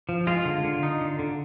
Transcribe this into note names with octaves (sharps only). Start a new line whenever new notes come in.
F3
G#3 F4
D3
D3
D#4
D3
D3